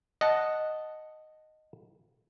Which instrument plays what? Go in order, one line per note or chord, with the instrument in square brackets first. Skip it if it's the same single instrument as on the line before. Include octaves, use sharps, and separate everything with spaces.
[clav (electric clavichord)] D#5 F#5 A5